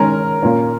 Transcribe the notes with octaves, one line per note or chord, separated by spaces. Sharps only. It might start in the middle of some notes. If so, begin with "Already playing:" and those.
Already playing: D#3 G#3 C#4 A#4
A#2 A#3 C#4